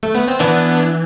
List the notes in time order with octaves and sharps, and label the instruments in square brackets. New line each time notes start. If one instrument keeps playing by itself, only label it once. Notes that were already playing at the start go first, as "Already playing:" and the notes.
[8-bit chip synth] A3
B3
C4
[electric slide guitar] E3 [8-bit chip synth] B3 D4